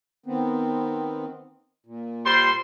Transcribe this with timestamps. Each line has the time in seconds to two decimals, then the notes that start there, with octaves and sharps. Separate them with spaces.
0.26 D#3 B3 C4
1.86 A#2
2.25 G3 C5 C6